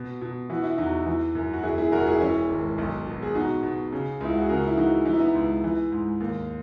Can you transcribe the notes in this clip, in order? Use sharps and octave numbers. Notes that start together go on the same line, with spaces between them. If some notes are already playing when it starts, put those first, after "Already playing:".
Already playing: B2
B2
E3 F#4
E4
E2 D#4 F#4
E3
F#2
F#4
E1 E4 G#4
E4 G#4
E1 F#4 A#4
E4 G#4
E3 C#4 E4
G#1
B1
B2
G#4
B2 D#4 F#4
B2
C#3
C#2 E4
F#4
G#4
C#3 F#4 A#4
E4
E3 D#4 F#4
E3 D#4
E4
B3 D#4
C#2
E3
G#2
D#2